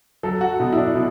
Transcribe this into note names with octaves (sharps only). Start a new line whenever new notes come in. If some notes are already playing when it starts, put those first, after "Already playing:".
F#3 A4
F#4
B2
E4
D4
B2